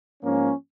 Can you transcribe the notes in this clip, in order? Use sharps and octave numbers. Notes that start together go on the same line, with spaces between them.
G#2 F3 A#3 C#4